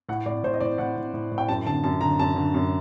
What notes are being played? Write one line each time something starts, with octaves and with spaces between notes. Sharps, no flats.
A2 F#5
A2 D5
A2 C5
D#5
A2 D5
A2 F#5
A2
A2
A2
G5
F#2 A5
D3 A5
F#2 A5
D3 A#5
F#2 A5
D3
F#2